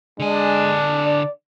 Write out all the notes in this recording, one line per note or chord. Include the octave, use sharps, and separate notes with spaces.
D3 G#3 D4 G#5
D5